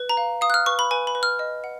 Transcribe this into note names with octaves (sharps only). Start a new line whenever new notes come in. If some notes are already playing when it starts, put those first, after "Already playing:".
Already playing: B4
A#5
F5
F5 D#6
F#6
F6
B4 C#6
B5
B4 G#5
B5
B4
F6
D#5
F#5